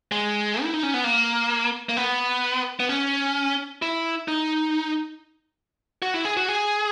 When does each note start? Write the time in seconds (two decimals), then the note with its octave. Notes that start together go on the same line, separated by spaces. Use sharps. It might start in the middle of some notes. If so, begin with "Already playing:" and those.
0.12 G#3
0.63 E4
0.74 D#4
0.83 C#4
0.94 B3
1.04 A#3
1.89 A#3
1.97 B3
2.80 B3
2.89 C#4
3.82 E4
4.28 D#4
6.02 F#4
6.14 E4
6.25 G#4
6.37 F#4
6.48 G#4